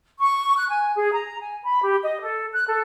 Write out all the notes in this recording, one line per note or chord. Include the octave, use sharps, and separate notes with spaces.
C#6
F#6
G#5
G#4
A#5
G#5
B5
G4
D#5
A4
F#6
A4